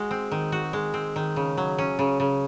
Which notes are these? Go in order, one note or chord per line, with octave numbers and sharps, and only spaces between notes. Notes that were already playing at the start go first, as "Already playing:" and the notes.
Already playing: G#3 F#4
C4
D#3
F#4
G#3
C4
D#3
C#3
F#3
C#4
C#3
C#3